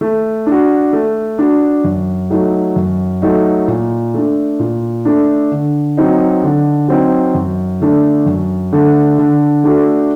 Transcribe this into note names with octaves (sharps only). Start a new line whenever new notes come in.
A3
D4
F#4
A3
D4 F#4
F#2
F#3 A3 D#4
F#2
F#3 A3 D#4
A#2
A3 D4
A#2
A3 D4
D3
F#3 C4 D#4
D3
F#3 C4 D#4
F#2
D3 A3 D4
F#2
D3 A3 D4
D3
A3 D4 F#4 A4